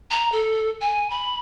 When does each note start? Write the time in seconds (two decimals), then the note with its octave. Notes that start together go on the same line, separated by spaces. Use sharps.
0.11 A#5
0.32 A4
0.81 G#5
1.10 B5